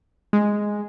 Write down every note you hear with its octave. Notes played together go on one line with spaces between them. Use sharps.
G#3